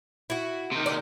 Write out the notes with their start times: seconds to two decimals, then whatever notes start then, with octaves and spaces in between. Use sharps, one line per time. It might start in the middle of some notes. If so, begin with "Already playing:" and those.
0.30 E4 F#4
0.72 C3 D#3
0.86 D5